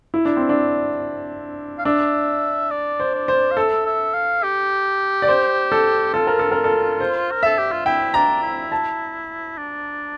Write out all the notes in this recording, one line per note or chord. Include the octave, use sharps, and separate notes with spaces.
E4
D4
C4
D4
F5
D4 E5
D5
C5
D5
C5
F5
A4 E5
E5
F5
G4
D5
C5
A4
F4 A4
A#4
A4
A#4
A4
C5
A#4
A4 E5
G4
F4
E4 G5
D4 A#5
E4
A5
D4